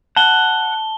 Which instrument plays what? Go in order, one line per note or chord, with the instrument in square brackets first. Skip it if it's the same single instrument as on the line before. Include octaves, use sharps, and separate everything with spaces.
[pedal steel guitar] F#5 [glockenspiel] A5 G7